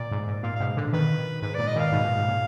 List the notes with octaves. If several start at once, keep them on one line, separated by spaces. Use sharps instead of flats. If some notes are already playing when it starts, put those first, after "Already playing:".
Already playing: A#2 D5
G#2
G#2
A#2 F5
G#2 B2 F5
A#2 D3
B2 D#3 B4
G#2 B4
A#2 D5
D#5
B2 D#3 F5
G#2 B2
A#2
G#2
A#2